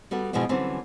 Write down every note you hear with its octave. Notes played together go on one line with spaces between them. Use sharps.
G3 B3 F#4 A4
B2 E3 F3 G#3 B3
D3 E3 F#3 G3 C4 C#4